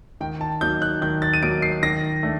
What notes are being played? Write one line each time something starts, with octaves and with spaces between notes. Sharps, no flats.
D#3 G5
A5
F#3 A#3 D#4 G6
F#6
D#3 G6
A6
D#7
F#3 A#3 D#4 D7
C7
D#3 A#6
A3 D4